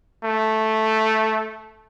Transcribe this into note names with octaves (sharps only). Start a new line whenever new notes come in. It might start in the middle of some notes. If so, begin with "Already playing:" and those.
A3